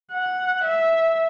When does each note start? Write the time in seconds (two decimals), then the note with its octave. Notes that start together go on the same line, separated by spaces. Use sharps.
0.12 F#5
0.65 E5